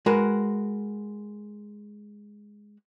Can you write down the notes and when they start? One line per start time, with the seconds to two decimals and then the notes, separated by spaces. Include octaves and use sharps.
0.06 G#3 F#4 A#4 B4